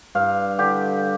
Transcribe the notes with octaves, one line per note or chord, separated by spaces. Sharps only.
G2 F5
D3 G4